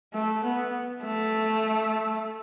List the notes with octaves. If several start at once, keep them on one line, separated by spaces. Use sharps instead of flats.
A3
B3
A3